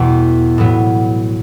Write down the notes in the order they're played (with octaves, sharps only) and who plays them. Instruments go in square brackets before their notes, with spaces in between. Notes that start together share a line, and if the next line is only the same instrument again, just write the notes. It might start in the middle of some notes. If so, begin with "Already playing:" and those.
Already playing: [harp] E2 B2 G3 A3
A2 F#3 B3